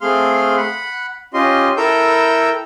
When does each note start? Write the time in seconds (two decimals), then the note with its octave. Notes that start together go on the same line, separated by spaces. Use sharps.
0.01 A3 C4 G#4 F5 C6 F6
0.57 F#5 B5
1.34 C#4 F4 G4 D#5 C6
1.77 E4 A4 A#4 G5 E6 G6